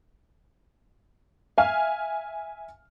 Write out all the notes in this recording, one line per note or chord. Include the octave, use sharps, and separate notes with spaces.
E5 F5 G#5 F6